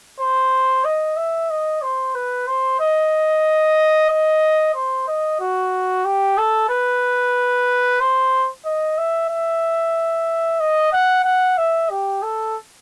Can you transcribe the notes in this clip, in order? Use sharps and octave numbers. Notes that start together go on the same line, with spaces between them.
C5
D#5
E5
D#5
C5
B4
C5
D#5
D#5
C5
D#5
F#4
G4
A4
B4
C5
D#5
E5
E5
D#5
F#5
F#5
E5
G4
A4